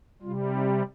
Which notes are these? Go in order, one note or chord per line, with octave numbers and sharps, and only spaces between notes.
C3 G3 F4
D#4